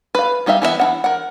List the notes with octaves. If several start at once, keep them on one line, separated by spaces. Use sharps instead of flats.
B4 F5
G3 D#4 G4 E5 F5
E3 B3 G#4 E5
E3 D#4 F#5
A#4 F#5